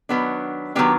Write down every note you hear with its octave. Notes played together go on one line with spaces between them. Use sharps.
D#3 F#3 B3 D4
D#3 F#3 B3 D4 G4